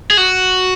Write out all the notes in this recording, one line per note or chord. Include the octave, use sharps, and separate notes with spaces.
G#4
F#4